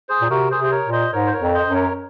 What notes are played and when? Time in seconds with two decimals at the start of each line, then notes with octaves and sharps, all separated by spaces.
0.09 G#4 C5
0.22 A#2
0.30 C3 F#4 A#4
0.51 G#4 C5
0.58 C3
0.64 C5
0.71 A#4 C#5
0.86 A#2
0.93 C5 D#5
1.12 G#2 A#4 C#5
1.26 C5
1.33 A#4 C#5
1.40 F2
1.54 C5 D#5
1.68 F#2
1.74 A#4 C#5